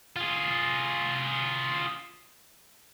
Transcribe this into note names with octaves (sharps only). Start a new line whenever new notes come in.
F4 G#4